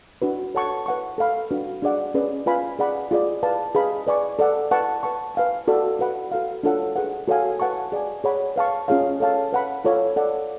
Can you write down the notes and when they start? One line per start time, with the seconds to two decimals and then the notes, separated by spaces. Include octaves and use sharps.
0.22 D4 F#4 B4
0.55 A4 C#5 F#5 A5 C#6
0.86 B4 F#5 C#6
1.18 A4 F5 B5
1.51 D4 F#4 B4
1.83 D4 G#4 D5 F#5
2.14 C#4 G#4 B4 D5
2.46 F4 B4 F5 G#5 B5
2.79 G#4 D5 F#5 B5
3.11 F4 G#4 D5
3.43 B4 D5 F5 A5
3.75 G#4 B4 F5 B5
4.07 B4 D5 G#5 C#6
4.39 A4 D5 F#5
4.71 B4 F#5 A5 C#6
5.03 B4 F#5 A5 C#6
5.35 B4 F5 G#5
5.68 F#4 A4 D5
5.99 F#4 B4 F#5 B5
6.32 F#4 A4 F5
6.63 D4 F4 A4 C#5 F#5
6.96 G#4 B4 F#5
7.28 F#4 A4 C#5 F5 G#5
7.60 B4 F#5 A5 C#6
7.92 G#4 D5 G#5
8.24 G#4 C#5 F#5 B5
8.56 B4 F5 A5 C#6
8.88 C#4 F4 G#4 C#5 F5
9.20 A4 C#5 F5 A5
9.53 B4 F#5 B5
9.85 F4 A4 C#5 F5
10.16 A4 D5 F#5